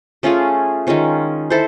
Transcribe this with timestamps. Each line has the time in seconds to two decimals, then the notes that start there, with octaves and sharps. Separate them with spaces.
0.23 A3 C#4 F4 G#4
0.87 D#3 G#3 C#4 F4
1.50 E4 A4 C5